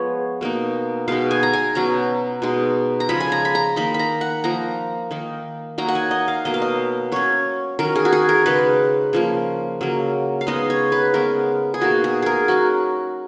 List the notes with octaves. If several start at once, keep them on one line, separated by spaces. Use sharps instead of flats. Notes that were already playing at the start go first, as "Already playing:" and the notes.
Already playing: F3 G#3 B3 C#5
B2 A#3 D#4
B2 G#3 B3 D#4 F5
G#5
A#5
G#5
B2 F#3 C#4 A#5
B2 G#3 D#4
A#5
C#3 F3 G#3 B5
G#5
A#5
B5
A#5
D#3 A#3 D#4 B5
B5
A#5
F#5
F3 A#3 D#4 A#5
D#3 A#3 D#4
F#3 A#3 D#4 A#5
F#5
G#5
D#5
F5
B2 F#3 A#3 D#5
F5
D#5
F#3 C#4 C#5
D#3 F#3 C#4 A#4
G#4
F#4
G#4
A#4
C#3 G#3 D#4 B4
C#3 F3 A#3
C#3 F#3 A#3
F5
C#3 G#3 B3 D#4 D#5
C#5
B4
C#3 G#3 B3 A#4
G#4
B2 A#3 D#4 F#4
G#4
G#4 A#4
F#3 C#4 F#4